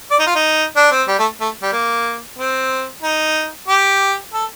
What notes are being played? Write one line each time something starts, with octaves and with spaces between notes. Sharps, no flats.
D5
D#4
F4
D#4
D4
C4
G3
A3
A3
G3
A#3
C4
D#4
G4
A4